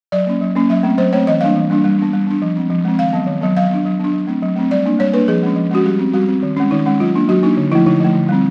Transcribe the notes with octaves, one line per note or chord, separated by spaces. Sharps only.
F#3 D5
A#3 C#4
F#3
A#3 C#4
F#3 E5
A3 C4
F#3 C5
A3 C4 C#5
E3 D#5
G3 A#3 D4 F5
E3
G3 A#3 D4
G3
B3 D4
G3
B3 D4
F3
G#3 C4
F3
G#3 C4
D#3 F5
F#3 B3
D#3
F#3 B3
F#3 F5
B3 D4
F#3
B3 D4
F#3
A3 C4
F#3
A3 C4
G3 D5
A#3 D4
G3 C#5
A#3 D4 B4
F3 G#4
G#3 C#4
F3
G#3 C#4 F#4
G3 G4
C4
G3 F#4
C4
D#3
G#3 C#4
D#3 D#4
G#3 C#4
F#3 F4
A#3 D4
F#3 F#4
A#3 D4 D#4
D3
F3 A3 E4
D3 D#4
F3 A3
D3
G3 C4